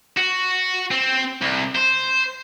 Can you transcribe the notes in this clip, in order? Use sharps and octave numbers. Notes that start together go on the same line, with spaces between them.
F#4
C4
C2
C5